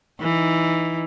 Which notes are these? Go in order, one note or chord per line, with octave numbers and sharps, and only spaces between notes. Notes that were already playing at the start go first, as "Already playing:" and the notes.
E3 D#4